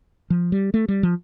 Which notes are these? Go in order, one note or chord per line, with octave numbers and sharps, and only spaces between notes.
F3
G3
A3
G3
F3